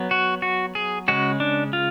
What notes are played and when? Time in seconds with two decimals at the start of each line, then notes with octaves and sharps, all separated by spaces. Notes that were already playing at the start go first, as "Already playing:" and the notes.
Already playing: F#3 B3
0.11 F#4
0.42 F#4
0.75 G#4
1.08 C#3 G#3 C#4 F#4
1.40 D4
1.73 F4